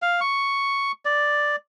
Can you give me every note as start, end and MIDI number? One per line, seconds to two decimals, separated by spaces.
0.02 0.20 77
0.21 0.92 85
1.05 1.56 74